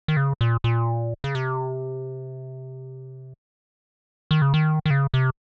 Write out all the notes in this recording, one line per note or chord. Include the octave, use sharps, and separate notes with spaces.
D#3
C#3
A#2
A#2
C#3
C3
D#3
C#3
D#3
D#3
C#3
C3